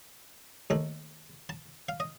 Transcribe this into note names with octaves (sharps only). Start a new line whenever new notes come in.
D#2 D#3 A3
A5
F5
D#5